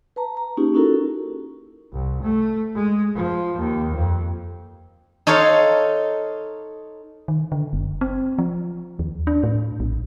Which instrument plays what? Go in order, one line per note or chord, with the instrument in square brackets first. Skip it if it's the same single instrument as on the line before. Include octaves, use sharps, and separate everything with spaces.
[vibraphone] B4 A5 A#5
A#5
A#3 C#4 D#4 F4 G4 G#4
C#4 D#4 E4 F#4 A4 A#4
[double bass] C2
A3
G#3
F3
D#2
F2
[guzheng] D#4 A4 C#5 F5 C6
[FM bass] D#3
D3
F#1
C4
F3
D#2
D4
A2
A#1